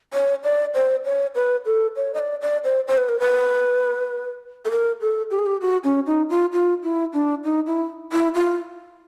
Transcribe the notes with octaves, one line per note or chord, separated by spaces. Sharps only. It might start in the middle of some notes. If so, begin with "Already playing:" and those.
C#5
D5
C5
C#5
B4
A4
C#5
D#5
D5
D5
C5
C5
B4
A#4
B4
A4
A#4
A4
G4
G#4
G4
F#4
C#4
D#4
F4
F4
E4
D4
D#4
E4
E4
F4